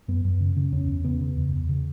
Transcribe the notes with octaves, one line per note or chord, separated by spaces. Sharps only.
F#2 B3
F#2
C#3
C#3
E2 C#4
E2
C#3 B3
C#3
E2
E2
C#3